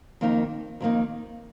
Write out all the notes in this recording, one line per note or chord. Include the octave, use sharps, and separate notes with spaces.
F2 D#3 A#3 D#4
F2 D#3 A#3 D#4